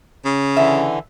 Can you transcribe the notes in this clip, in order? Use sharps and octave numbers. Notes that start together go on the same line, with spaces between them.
C#3
D3 E3 E5